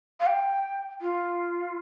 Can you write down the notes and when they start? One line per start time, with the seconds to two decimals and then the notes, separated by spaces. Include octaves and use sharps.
0.20 F5
0.27 G5
1.01 F4